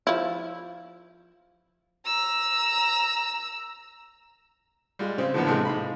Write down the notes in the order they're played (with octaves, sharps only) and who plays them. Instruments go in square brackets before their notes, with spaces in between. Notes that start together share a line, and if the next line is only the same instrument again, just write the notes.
[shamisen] F3 E4
[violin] A#5 E6
[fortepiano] G3 G#3 F4
C#3 C4
A2 D3 E3 F3 A#3 B3
A2 C3 E3 G#3 A3 F4
G#2 F5 B5